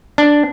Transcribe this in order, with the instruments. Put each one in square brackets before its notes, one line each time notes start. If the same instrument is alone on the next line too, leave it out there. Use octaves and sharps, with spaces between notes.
[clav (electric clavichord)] D4